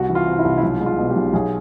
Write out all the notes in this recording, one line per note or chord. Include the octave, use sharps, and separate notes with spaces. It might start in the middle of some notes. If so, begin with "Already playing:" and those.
Already playing: C2 F#4
E3
F4
C3
E4
C2
E4
B1 F4
G#3
F4
B2
G4
B1
B1 G#4